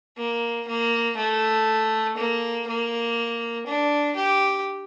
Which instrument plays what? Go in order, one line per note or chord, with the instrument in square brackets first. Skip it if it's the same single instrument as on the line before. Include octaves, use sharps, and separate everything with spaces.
[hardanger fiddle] A#3
A#3
A3
A#3
A#3
D4
G4